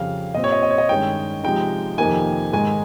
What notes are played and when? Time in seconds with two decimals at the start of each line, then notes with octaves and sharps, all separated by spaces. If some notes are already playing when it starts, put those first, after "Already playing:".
Already playing: F2 C#3 G3 F5
0.35 A#2 G3 C4 D#5
0.44 C#5
0.52 D#5
0.63 D#5
0.71 C#5
0.78 D#5
0.89 G2 D#3 G#3 C#4 G5
1.44 C3 F3 G#3 D#4 G5
1.98 F2 C3 D#3 A#3 D#4 G#5
2.53 G#2 D#3 G#3 D#4 G#5